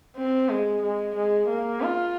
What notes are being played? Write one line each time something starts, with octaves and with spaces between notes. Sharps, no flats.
C4
G#3
G#3
G#3
A#3
F4